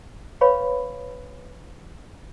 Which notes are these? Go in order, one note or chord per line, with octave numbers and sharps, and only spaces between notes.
B4 C#5 F5 B5 C#6